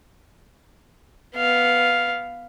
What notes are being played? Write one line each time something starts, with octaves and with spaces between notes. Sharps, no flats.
B3 F5